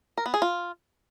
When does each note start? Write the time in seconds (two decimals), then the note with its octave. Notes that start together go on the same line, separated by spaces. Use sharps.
0.17 A#4
0.26 B3
0.34 G#4
0.42 F4